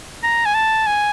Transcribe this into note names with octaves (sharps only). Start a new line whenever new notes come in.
A#5
G#5
A5
G#5